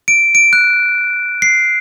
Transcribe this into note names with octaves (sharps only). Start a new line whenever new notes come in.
D7
D7
F#6
C7